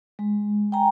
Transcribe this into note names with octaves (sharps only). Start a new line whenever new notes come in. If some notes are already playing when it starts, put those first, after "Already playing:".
G#3
G5 G#5 A#5